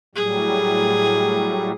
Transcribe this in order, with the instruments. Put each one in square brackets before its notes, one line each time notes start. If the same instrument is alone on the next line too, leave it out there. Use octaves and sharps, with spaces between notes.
[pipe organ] A2 F#3 G3 [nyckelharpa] G#4